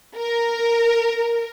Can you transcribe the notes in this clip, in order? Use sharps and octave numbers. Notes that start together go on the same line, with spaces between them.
A#4